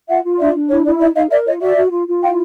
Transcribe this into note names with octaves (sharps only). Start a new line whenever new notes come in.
F4 E5 F#5
F4
D4 D5 E5
D4
E4 C#5
E4 D5
D#4 D5 E5
D#4 D#5 F5
A#4 D5 E5
F4 C#5 D#5
F#4 D5 E5
F#4
F4
F4
E4 F5 G5